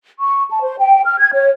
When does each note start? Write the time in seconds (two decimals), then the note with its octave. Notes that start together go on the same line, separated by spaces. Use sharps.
0.19 C#6
0.50 A5
0.63 C5
0.80 G5
1.04 F6
1.19 G#6
1.34 C#5